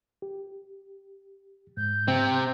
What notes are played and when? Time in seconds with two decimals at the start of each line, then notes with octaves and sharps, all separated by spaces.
0.22 G4
1.77 G#2 G6
2.08 C3 C4